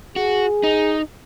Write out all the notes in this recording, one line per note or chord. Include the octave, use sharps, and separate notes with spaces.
F#4 G#4
D#4